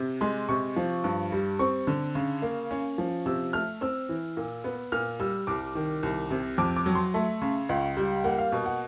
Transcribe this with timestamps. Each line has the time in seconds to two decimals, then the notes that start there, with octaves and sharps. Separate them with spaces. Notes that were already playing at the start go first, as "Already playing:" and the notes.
Already playing: C3
0.21 G#3 C6
0.49 C3 C#6
0.76 F3
1.04 G2
1.32 G3
1.59 C4 C#6
1.87 D3
2.15 C#3
2.42 A#3
2.71 C#4
2.98 F3
3.26 C3 E6
3.53 A3 F6
3.81 C4 E6
4.09 E3
4.37 A#2
4.64 B3
4.92 A#2 F6
5.20 G3 E6
5.47 C2 D6
5.75 D#3
6.03 C2
6.31 C3
6.58 F2 D6
6.76 D6
6.86 F#3
6.95 C6
7.14 A3
7.41 C#3
7.69 C#2
7.97 G3
8.24 A#3 F#5
8.38 F5
8.52 B2
8.66 F#5